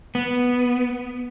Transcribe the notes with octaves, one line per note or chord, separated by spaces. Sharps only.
B3